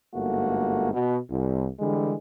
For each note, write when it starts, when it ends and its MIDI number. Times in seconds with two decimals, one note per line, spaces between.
0.14 0.92 31
0.14 0.92 44
0.14 0.92 57
0.14 0.92 58
0.14 0.92 66
0.94 1.18 47
1.30 1.67 36
1.80 2.15 50
1.80 2.15 52
1.80 2.15 55
1.80 2.15 56